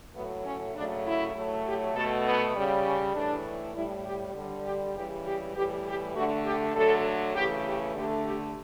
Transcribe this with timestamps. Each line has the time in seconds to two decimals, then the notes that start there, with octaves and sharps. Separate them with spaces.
0.14 A2 F#3 A3 B3
0.45 C#4
0.75 C#3 F#3 A3 D4
1.05 E4
1.35 A2 F#3 A3
1.65 G4
1.95 B2 A3 A4
2.25 B3
2.55 C#3 G3
2.85 C#4
3.14 A2 E3 A3 D4
3.75 A2 G3 E4
4.05 G4
4.35 D3 G3
4.65 G4
4.95 C#3 E3 G3 G4
5.25 G4
5.55 A2 E3 G3 G4
5.85 G4
6.15 D3 A3 F#4
6.45 G4
6.75 D3 F#3 A3 A4
7.35 C#3 E3 A3 G4
7.66 G4
7.95 D3 A3 G4
8.25 G4